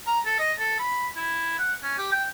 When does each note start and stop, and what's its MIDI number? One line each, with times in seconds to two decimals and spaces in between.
0.07 0.20 82
0.26 0.36 69
0.39 0.53 75
0.59 0.79 69
0.79 1.07 83
1.16 1.56 64
1.59 1.74 78
1.83 1.96 61
1.98 2.12 67
2.12 2.25 79